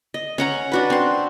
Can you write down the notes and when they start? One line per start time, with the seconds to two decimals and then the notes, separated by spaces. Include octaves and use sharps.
0.14 D#5
0.38 C#4 F#5 A#5
0.72 D4 F#4 B4
0.90 C4 C6